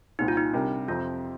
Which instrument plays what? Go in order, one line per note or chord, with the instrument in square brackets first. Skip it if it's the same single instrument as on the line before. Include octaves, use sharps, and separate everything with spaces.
[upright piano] C2 A#2 G3 C4 [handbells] D#4
[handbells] F4
D#4
[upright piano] C3 G3 D4 G4 A#4
[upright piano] F2 C3 F3 C4 [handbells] F4